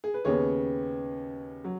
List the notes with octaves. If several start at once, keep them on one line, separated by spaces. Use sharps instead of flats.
G#4
B4
D#2 C#3 B3 G#4 C#5
F#3